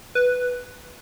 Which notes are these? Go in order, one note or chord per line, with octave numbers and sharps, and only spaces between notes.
B4